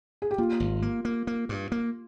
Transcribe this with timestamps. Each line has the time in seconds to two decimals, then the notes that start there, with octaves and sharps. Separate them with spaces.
0.22 G#4
0.31 G4
0.38 A#3 F4
0.60 G#1
0.82 A#3
1.05 A#3
1.27 A#3
1.49 G2
1.72 A#3